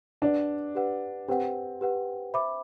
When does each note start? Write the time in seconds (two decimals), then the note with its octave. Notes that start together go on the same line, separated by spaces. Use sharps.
0.22 D4 G4 B4 F#5
0.75 G4 B4 F#5
1.28 C4 G4 B4 F#5
1.81 G4 B4 F#5
2.34 C5 E5 B5 D6